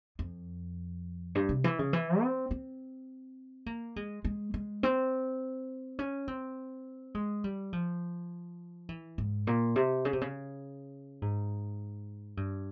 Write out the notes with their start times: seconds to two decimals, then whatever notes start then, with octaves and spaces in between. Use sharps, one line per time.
0.19 F2
1.35 G2
1.49 C3
1.64 E3
1.79 C#3
1.93 E3
2.22 C4
2.51 C4
3.66 A#3
3.96 G#3
4.24 G#3
4.54 G#3
4.83 C4
5.99 C#4
6.28 C4
7.15 G#3
7.44 G3
7.73 F3
8.89 E3
9.18 G#2
9.47 A#2
9.76 C3
10.05 C#3
10.13 C3
10.21 C#3
11.22 G#2
12.37 G2